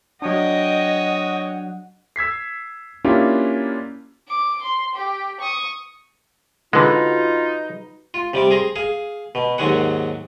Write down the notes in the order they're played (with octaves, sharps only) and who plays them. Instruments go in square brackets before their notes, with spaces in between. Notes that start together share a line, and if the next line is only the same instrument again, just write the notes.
[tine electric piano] F#3 D4 [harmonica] C#5 G5 D#6 [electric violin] D#5 [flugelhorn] F#5
[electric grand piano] E6 G#6 B6 C7
A#3 C#4 D4 E4 F4 G4
[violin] D6
C6
G4
C#6 D#6
[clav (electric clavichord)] D3 G#3 [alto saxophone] D#4 [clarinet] F4 [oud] F#4 B4
[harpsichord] F4
C3 G3 D5
G#4 A#5 C6
G#4 F5
B2
D#2 G#2 F#3 G#3 G#4 F#5